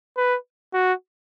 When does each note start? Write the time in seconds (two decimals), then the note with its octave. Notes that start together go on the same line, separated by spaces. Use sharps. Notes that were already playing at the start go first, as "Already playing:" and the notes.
0.16 B4
0.73 F#4